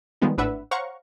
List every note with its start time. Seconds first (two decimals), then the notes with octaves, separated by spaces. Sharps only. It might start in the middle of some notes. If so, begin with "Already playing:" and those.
0.22 D#3 F3 G3 G#3 B3 D#4
0.38 G#1 A2 D4 B4 E5 F#5
0.71 C5 C#5 F5 F#5 A#5 C#6